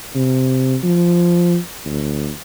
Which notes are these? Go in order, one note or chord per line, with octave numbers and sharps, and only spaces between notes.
C3
F3
D2